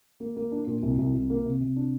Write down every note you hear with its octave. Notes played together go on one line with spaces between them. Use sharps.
A#3
A#3
D4
A#2
C2
C2
C2
A#3
C3
C3
D4